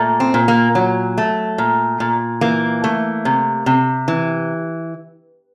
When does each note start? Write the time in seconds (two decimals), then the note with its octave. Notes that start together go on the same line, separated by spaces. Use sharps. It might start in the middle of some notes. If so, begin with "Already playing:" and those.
Already playing: A#2 A3
0.20 C4
0.34 A#2
0.48 A#3
0.75 F#3
1.18 A3
1.58 A#2
2.00 A#2
2.41 E3 A#3
2.84 A3
3.25 C3
3.66 C3
4.08 E3